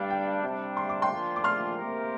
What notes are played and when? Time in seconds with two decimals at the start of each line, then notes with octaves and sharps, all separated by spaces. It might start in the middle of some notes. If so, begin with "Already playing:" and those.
Already playing: G2 G3 D4 F5 G5
0.10 G5
0.43 C3 G3 D4
0.77 C6
0.89 D6
1.02 G5 C6
1.11 A#2 F3 D4 F4
1.36 D6
1.44 C6 F6
1.77 C3 A#3 G4 A#4